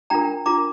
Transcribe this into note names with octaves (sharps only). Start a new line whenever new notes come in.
D4 F4 A#4 G5 A#5
D4 F4 A#4 A#5 D6